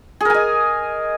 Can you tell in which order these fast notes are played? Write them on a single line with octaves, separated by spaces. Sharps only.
G#4 A#4 G#5 D#5